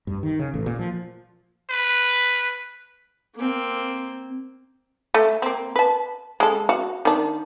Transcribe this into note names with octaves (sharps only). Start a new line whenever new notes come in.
G2
D#3
C#3
A1
A#2
F3
B4
A#3 C4
A3
A#3 C4
B4 A5
G#3 A4
F#4 F5
D#3 D4